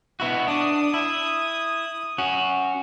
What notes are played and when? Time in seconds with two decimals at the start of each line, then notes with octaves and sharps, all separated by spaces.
0.20 B3 E4 F#4
0.48 D4 D#6
0.94 E4
2.18 C#4 F#4